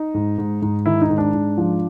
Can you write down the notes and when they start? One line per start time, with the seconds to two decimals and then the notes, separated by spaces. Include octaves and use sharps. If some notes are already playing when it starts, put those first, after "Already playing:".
Already playing: D#4
0.14 G#2
0.38 G#2
0.62 G#2
0.86 D#3 E4
1.02 D#4
1.10 G#2
1.18 D4
1.33 G#2
1.58 F3